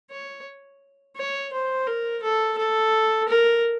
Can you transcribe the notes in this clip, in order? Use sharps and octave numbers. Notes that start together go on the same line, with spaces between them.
C#5
C#5
C5
A#4
A4
A4
A#4